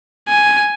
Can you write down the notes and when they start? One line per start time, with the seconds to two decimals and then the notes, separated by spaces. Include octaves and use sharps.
0.28 G#5